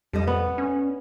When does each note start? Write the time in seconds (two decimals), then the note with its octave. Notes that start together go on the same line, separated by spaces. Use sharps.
0.13 F2 G3 A4 D#5
0.27 B3 D5
0.58 C#4